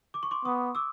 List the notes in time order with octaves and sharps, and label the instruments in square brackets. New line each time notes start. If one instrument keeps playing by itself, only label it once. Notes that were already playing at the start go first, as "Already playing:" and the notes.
[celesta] D6
C#6
C6 D6
[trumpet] B3 [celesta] C#6 D#6
[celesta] D6 E6